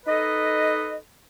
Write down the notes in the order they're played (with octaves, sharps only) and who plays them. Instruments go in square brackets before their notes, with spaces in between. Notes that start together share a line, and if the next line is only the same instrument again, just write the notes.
[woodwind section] D#4 A4 B4 D#5